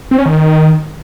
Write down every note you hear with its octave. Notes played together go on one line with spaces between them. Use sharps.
C4
C#4
D#3